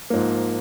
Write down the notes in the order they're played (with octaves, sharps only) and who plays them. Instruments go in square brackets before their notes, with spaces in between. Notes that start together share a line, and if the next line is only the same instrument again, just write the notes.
[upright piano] G#2 F3 A#3